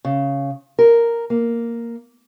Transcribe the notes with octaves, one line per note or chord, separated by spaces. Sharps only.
C#3
A#4
A#3